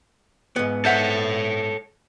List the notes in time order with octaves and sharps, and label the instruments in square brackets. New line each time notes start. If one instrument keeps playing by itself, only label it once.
[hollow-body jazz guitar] G#2 B3
[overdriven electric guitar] A4 C#5 [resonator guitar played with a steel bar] C5 E5 F#5